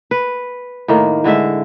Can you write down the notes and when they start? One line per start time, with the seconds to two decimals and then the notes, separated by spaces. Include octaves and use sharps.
0.11 B4
0.88 A2 D#3 A#3
1.24 A2 D3 G#3 E5